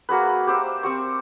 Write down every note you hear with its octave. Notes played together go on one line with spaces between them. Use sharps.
A#3 F#4 G#4 B4
G4 C5 E5
C4 G4 C#6